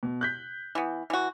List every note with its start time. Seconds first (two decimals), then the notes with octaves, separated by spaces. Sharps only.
0.03 B2
0.21 F#6 G6 B6
0.75 E3 B3
1.10 E3 F#4